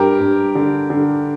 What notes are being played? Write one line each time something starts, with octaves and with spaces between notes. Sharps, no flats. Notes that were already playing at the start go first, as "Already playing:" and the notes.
Already playing: G2 G4 A#4
G2
D3
D3